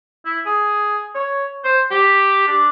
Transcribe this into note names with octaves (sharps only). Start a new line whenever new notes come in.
E4
G#4
C#5
C5
G4
D4